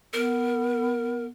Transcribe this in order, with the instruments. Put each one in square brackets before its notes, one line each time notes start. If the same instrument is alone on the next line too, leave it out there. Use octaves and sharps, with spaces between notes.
[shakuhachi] B3 [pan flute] A#4